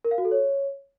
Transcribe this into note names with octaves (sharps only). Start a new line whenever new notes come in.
A#4
F5
F#4
A4
C#5